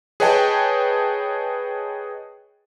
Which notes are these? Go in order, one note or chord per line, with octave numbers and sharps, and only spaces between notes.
G#4 B4 C#5 D#5 G5 A5